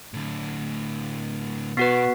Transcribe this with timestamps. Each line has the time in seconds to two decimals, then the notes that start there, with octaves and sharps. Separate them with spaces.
0.14 A2 D3
1.77 B2 B3 F#4 B4 F#5 B6 C7